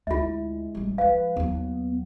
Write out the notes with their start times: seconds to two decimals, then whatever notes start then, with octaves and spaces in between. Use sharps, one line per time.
0.07 D2 G#3 E4 F4 E5
0.75 A1 G3
0.98 F3 G#3 B4 F5
1.36 D#2 F#3 B3